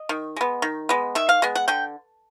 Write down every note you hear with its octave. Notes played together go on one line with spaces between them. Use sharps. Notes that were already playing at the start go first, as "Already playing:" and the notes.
Already playing: D#5
D#3
G#3 B3
D#3
G#3 B3
D#3 E5
F5
G#3 B3
F#5
D3 G5